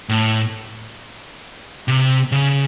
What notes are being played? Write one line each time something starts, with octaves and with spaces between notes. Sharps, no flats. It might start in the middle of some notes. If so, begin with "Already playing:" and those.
A2
C3
C#3